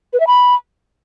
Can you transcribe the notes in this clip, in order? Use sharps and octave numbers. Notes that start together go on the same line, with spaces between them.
B4
E5
B5